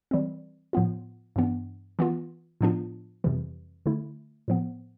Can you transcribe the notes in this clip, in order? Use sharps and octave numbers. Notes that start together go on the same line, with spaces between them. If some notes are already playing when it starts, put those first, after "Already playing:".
E3 G3 C4
A2 F3 B3 F4
G2 E3 B3 D4
E3 B3 F4
A2 F3 B3 D4 F4
F2 C3 E3 G3
D3 A3 E4
A2 F3 B3